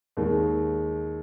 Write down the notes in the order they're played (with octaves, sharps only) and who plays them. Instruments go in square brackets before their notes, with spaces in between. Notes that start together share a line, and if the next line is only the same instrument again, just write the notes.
[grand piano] D#2 D#3 G#3